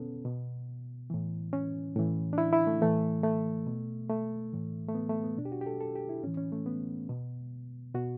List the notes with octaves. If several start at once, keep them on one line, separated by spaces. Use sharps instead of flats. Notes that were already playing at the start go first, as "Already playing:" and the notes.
Already playing: B2 B3 C#4 A4
B2
A2 E3
C#4
A2 E3
D4
E4
E4
A3
A2 E3 A3
A3
B2
A3
A2 E3
A3
B3
A3
B3
B2 D4
G4
F#4
G4
A4
A4
G4
E4
A2 E3 C#4
C#4
A3
B3
B2
B2 F#4